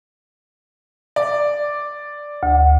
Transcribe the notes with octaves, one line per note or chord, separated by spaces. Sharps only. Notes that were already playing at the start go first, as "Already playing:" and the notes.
D5
D2